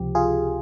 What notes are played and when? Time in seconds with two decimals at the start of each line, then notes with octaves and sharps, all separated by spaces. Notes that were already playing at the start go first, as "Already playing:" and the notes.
Already playing: C#2 C3 F3 G4
0.15 F4 G#4